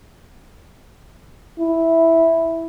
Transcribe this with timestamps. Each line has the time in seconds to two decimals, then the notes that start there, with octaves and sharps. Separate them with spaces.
1.60 E4